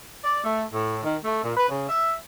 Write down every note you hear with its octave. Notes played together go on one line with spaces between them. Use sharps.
D5
A3
A2
D#3
A3
A#2
B4
C#3
E5